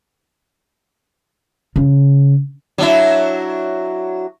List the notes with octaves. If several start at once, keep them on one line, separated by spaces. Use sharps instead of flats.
C#3
F#3 D4 E4